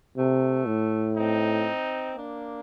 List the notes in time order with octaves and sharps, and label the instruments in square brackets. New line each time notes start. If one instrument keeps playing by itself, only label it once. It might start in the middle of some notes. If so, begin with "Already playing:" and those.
[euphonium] C3 [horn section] A3
[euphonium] A2
[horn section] C4 D#4
A#3 D4